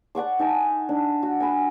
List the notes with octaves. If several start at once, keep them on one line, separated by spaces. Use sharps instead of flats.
D5 F#5 C#6 D6
D#4 G#5 A5
D4
F#4
G#5 B5